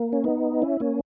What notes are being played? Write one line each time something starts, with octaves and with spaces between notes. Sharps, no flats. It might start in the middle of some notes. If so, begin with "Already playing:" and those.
Already playing: A#3
C#4
B3 D#4
C#4 E4
A#3 C#4